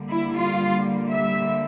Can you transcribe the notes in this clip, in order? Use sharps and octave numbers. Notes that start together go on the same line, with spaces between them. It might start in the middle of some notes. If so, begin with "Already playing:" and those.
Already playing: D3 G3 A#3
E4
F4
E5